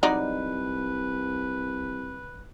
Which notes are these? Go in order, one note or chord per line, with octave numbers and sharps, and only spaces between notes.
C2 F#3 D#4 B4 D5